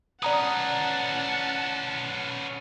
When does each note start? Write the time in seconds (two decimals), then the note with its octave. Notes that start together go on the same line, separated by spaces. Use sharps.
0.23 C#4 B4 D5 F#5 A5 A#5 D#6